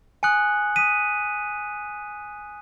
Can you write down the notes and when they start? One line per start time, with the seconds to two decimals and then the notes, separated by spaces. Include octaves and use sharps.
0.23 G#5 D#6 F#6 C#7 F#7
0.76 D#6 B6 D#7